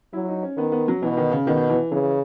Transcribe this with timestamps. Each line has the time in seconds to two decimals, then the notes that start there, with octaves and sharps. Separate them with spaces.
0.13 F#3 E4
0.28 D#4
0.43 C#4
0.57 D#3 B3
0.72 B3
0.88 F#3
1.02 B2 E3
1.17 D#3
1.32 C#3
1.47 B2 D#3
1.69 E3
1.92 C#3 E3